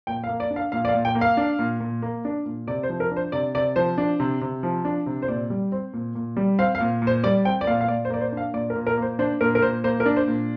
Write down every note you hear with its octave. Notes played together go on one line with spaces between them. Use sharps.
A#2 G5
F5
A#3
D5
D4
F5
A#2 F5
D5
F5
A#2
G5
A#3
F5
D4
A#2
A#2
A#3
D4
A#2
C3 D5
C5
F3
A#4
D4
C5
C3 D5
C3 D5
F3 C5
D4
C3
C3
F3
D4
C3
C5
A#2 D5
G3
C4
A#2
A#2
G3
C4 F5
F5
A#2
A#2
C5
G3 D5
C4 G5
D5
A#2 F5
F5
A#2 D5
C5
A#3 D5
C5
D4 F5
A#2 D5
A#4
A#2
A#4
A#3 C5
D4 C5
A#2 A#4
A#4
A#2 C5
A#3 C5
A#4
D4
C5
A#2